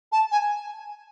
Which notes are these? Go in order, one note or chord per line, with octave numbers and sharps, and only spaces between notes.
A5
G#5